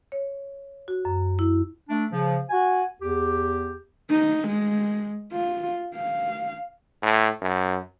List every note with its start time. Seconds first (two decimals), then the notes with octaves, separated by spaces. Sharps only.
0.12 C#5
0.88 F#4
1.05 F#2
1.39 E4
1.89 A3 D4
2.12 C#3 F3
2.50 F#4 G#5
3.01 E2 G4
4.10 D#4
4.48 G#3
5.33 F4
5.95 F5
7.02 A2
7.41 F#2